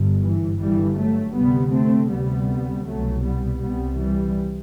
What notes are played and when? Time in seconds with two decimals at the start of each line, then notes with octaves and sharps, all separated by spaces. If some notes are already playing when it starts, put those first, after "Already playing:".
Already playing: G1 G2
0.22 E3
0.59 G1 G2 E3 G3
0.96 F#3 A3
1.35 D2 C3 G3 B3
1.72 A3 C4
2.10 D2 C3 G3 B3
2.85 C2 B2 F#3 A3
3.23 G3 B3
3.60 C2 C3 G3 B3
3.98 E3 G3